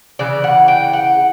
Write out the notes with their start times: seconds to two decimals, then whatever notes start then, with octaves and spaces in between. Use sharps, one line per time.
0.19 C#3 E3 D5
0.44 F#5
0.68 G5
0.93 F#5